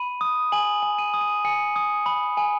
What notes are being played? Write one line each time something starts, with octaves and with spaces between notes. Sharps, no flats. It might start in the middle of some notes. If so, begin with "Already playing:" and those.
Already playing: B5 D#7
D#6
G#5 F#7
G#5
D#7
D#6
D#7
G#5 C#7
D#6
B5
G#5